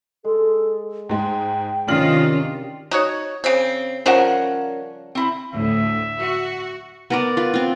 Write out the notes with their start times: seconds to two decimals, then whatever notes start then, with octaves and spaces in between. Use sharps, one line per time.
0.25 G#3 A4
1.09 G#2 G#3 G5 C6
1.88 C3 D#3 C#4 D4 F4 G4 F6 F#7
2.91 D#4 F#4 C#5
3.44 C#3 C4
4.06 C#3 F3 G3 C#4 A#4 F#5
5.15 C4 E4
5.52 D2 A2 E5
6.20 F#4
7.10 B3 A#4 D5
7.37 F4 B4
7.54 C4 F4